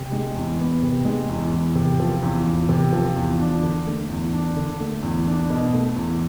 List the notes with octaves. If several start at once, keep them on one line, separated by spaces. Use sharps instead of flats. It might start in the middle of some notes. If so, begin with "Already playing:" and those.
Already playing: C3
G#3
E2
B3
C3
G#3
E2
E2
C3
F3
E2
E2
C3
F3
E2
D4
D3
A3
E2
D4
D3
A3
E2
D4
B2
A3
E2